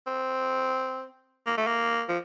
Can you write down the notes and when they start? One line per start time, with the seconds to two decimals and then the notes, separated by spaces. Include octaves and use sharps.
0.07 C4
1.47 A#3
1.57 A3
1.67 A#3
2.09 F3